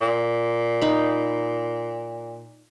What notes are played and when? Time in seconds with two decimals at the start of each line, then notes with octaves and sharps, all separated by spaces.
0.01 A#2
0.82 D#4 B5